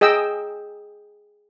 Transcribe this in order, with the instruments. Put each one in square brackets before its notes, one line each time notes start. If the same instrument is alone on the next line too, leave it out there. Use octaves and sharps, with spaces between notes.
[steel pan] G#4 D#5 G5 E6